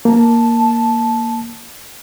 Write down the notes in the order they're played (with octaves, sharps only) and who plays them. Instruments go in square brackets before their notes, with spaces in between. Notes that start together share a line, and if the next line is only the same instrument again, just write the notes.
[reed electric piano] A#3 [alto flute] A5